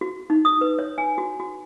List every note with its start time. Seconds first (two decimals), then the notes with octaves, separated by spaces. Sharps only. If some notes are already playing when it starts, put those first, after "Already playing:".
0.01 F#4
0.30 D#4
0.45 D#6
0.61 B4
0.79 C#5
0.98 G#5
1.18 F#4
1.40 F#4